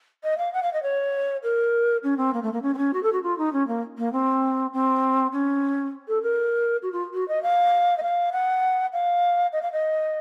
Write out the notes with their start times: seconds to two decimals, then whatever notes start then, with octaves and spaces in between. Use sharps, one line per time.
0.23 D#5
0.37 F5
0.53 F#5
0.62 F5
0.73 D#5
0.82 C#5
1.43 A#4
2.03 C#4
2.17 C4
2.33 A#3
2.42 A3
2.52 A#3
2.62 C#4
2.74 C4
2.77 C#4
2.93 F#4
3.03 A4
3.12 F#4
3.22 F4
3.38 D#4
3.52 C#4
3.67 A#3
3.97 A#3
4.12 C4
4.73 C4
5.32 C#4
6.08 A4
6.22 A#4
6.82 F#4
6.92 F4
7.13 F#4
7.28 D#5
7.42 F5
7.97 D#5
8.02 F5
8.32 F#5
8.92 F5
9.52 D#5
9.62 F5
9.72 D#5